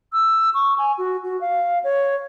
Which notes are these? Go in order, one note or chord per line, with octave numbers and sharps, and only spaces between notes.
E6
C#6
G#5
F#4
F#4
F5
C#5